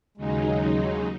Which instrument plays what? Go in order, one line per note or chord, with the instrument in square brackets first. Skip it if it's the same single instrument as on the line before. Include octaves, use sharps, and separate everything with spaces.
[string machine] D#2 C#3 F#3 D#4 [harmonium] G#3
[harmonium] C#4